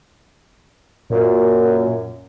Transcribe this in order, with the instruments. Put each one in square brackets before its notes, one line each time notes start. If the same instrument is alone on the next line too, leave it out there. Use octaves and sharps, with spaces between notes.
[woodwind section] F#2 [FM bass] A#2